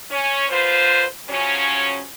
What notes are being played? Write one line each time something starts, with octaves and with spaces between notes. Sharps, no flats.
C#4
D3 F4 B4 C5
C#3 F3 F#3 C#4